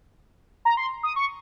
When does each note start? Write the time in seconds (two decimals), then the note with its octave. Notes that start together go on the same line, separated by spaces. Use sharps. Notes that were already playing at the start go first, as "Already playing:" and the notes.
0.65 A#5
0.77 C6
1.03 D#6
1.16 C#6